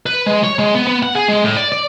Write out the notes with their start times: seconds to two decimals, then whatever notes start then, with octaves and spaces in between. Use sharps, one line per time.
0.06 B4
0.27 G#3
0.44 C#5
0.59 G#3
0.74 B3
0.87 B3
1.03 F#5
1.15 G#4
1.28 G#3
1.44 A2
1.57 D5
1.72 D5